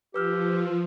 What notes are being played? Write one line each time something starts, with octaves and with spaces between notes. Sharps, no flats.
F3 G4 B4 E6 F6